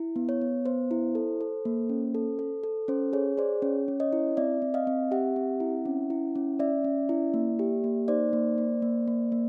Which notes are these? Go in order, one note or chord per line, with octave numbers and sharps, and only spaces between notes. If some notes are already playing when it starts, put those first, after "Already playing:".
Already playing: E4
B3
C#5
B3
B3 C5
E4
A4
A4
A#3
C#4
A4
A4
A4
C#4 C5
G#4 C#5
G#4 C5 D5
C#4 C#5
C#4
C#5 D#5
E4
C4 D5 E5
C4
D#5 F5
C4
G4 E5 F#5
C4
E4
C#4
E4
C#4
C#4 D5 E5
C#4
E4
A#3
G4
A#3
D#4 C5 D5
A#3
A#3
A#3
A#3
A#3